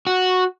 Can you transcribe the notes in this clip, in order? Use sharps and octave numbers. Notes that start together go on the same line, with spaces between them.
F#4